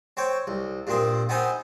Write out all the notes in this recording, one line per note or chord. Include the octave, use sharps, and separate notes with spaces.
C4 C#5 G5
C2
G2 A#2 C4 D#6
B3 C4 D#4 G#5